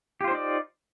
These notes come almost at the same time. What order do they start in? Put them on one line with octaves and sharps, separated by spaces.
G4 F4 C5 D#4 D5